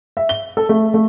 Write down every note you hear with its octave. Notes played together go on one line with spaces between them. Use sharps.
E5
G7
A4
A3
A3